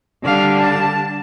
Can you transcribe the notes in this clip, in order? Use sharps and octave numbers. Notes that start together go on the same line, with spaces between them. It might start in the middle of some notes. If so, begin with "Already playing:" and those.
D3 G3 D4 F5
A5